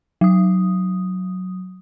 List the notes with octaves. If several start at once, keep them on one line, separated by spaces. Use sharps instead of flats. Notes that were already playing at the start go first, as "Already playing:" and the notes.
F#3 D#6